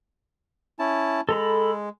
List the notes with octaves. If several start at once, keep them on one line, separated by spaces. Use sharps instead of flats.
C#4 E4 A5
G#3 A4 A#5 B5